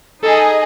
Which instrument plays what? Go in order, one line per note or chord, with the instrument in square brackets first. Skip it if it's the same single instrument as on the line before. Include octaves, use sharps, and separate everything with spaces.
[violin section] D#4 G#4 D#5 [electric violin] A4